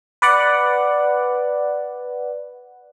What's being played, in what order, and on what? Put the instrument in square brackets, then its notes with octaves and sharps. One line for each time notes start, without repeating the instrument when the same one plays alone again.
[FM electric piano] B4 D5 F#5